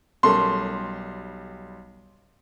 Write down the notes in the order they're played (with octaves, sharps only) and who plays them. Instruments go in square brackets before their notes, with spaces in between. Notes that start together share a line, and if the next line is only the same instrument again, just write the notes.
[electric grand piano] B1 G3 [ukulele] C#4 A4 A#4 [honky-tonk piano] C6